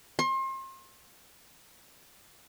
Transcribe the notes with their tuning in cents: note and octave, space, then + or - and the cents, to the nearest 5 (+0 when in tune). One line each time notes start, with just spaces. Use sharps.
C6 +35